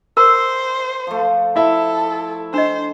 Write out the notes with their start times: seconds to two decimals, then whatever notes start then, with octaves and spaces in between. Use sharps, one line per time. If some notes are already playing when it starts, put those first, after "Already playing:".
0.17 A#4 C5
1.07 F3 A3
1.56 E4 A4 E5
2.54 D4 C5 D#5